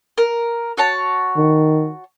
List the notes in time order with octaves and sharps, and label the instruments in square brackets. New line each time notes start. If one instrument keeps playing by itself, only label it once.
[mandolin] A#4
F#4 C#5 A5
[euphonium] D#3